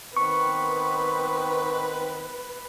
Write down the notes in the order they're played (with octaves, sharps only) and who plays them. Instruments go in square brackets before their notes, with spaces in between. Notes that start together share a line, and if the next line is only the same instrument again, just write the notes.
[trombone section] D#3 B3 C4 [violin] B4 [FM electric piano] C#6